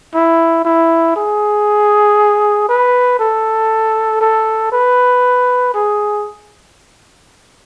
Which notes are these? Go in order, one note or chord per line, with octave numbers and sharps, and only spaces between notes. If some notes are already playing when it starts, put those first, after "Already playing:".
E4
E4
G#4
B4
A4
A4
B4
G#4